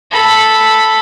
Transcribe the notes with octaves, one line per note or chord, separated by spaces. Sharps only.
A4 B5